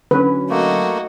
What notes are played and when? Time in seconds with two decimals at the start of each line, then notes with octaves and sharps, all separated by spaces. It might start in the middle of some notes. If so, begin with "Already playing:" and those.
0.11 D3 F#3 C#4 B4
0.50 A3 A#3 D#4 F#4